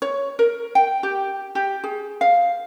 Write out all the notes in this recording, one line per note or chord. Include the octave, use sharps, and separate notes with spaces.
C#5
A#4
G5
G4
G4
G#4
F5